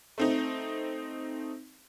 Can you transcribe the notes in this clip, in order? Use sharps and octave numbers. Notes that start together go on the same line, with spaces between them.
A3 C4 D#4